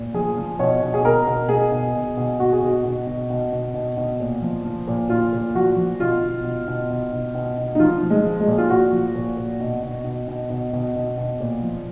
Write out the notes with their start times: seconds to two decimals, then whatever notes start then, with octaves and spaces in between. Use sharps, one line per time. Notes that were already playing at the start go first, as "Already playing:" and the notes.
Already playing: A#2
0.14 F3 G#4
0.37 F3
0.59 B2 C#5
0.82 B2
0.94 G#4
1.05 B2 A#4
1.27 B2
1.49 B2 G#4
1.72 B2
1.95 B2
2.17 B2
2.39 B2 F#4
2.53 G#4
2.62 B2 F#4
2.84 B2
3.07 B2
3.30 B2
3.52 B2
3.74 B2
3.97 B2
4.20 A#2
4.42 F3
4.65 F3
4.88 A#2
5.09 A#2 F4
5.33 A#2
5.55 F3 F#4
5.77 F3
6.00 B2 F4
6.23 B2
6.44 B2
6.67 B2
6.90 B2
7.13 B2
7.35 B2
7.57 B2
7.75 D#4
7.79 F3 F4
8.03 F3
8.10 G#3
8.25 F3
8.40 G#3
8.47 A#2
8.58 F4
8.69 A#2 F#4
8.92 F3
9.15 A#2
9.37 A#2
9.60 B2
9.82 B2
10.04 B2
10.27 B2
10.50 B2
10.73 B2
10.95 B2
11.17 B2
11.40 A#2
11.63 F3